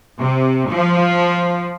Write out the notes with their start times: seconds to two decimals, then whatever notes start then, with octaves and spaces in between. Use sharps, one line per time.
0.20 C3
0.70 F3